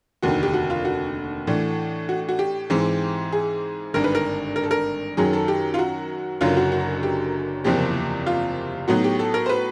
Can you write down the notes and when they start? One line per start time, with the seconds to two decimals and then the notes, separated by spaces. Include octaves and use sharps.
0.22 F1 D#2 D3 F#4
0.43 G4
0.54 F#4
0.70 F4
0.85 F#4
1.47 A2 E3 A3 D4
2.09 F#4
2.29 F#4
2.39 G4
2.70 G#2 E3 G#3 C4
3.32 G#4
3.94 G#1 G2 D3 A#4
4.04 B4
4.15 A#4
4.56 A#4
4.63 A4
4.71 A#4
5.17 F#2 D#3 F#3 G#4
5.33 A4
5.48 G4
5.74 F4
5.79 F#4
6.41 F#1 F#2 D3 F#3 F4
6.57 F#4
6.72 F#4
7.03 G4
7.64 F#1 E2 C3 F3 A#3 G4
8.27 F4
8.88 A2 F#3 B3 D#4 F#4
9.04 G4
9.19 A4
9.34 A#4
9.46 C5
9.49 B4